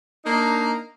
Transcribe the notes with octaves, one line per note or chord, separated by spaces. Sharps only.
A#3 D4 D#4